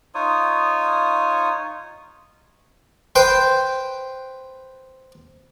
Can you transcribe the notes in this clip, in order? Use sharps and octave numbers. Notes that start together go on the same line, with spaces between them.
D#4 F4 C#5 D#6
B4 C5 G5